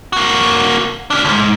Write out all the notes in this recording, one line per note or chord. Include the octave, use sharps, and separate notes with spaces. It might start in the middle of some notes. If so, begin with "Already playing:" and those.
A#3 F#4
C#4 D4
C#2 G#2